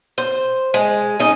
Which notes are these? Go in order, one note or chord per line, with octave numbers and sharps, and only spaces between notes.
C5
G#3
C#4 D#4